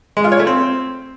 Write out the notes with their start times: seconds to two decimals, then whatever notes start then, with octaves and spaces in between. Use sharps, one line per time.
0.17 G#3
0.24 F4
0.32 C#5
0.39 A3
0.47 C4